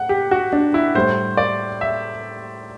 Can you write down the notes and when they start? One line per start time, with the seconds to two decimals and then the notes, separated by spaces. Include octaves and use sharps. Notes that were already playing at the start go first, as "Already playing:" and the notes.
Already playing: A2 F#5
0.09 G4
0.31 F#4
0.53 D4
0.74 E4
0.95 A2 G3 C5
1.37 D5
1.81 E5